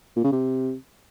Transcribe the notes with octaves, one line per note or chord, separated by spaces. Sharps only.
A#2
C#3
C3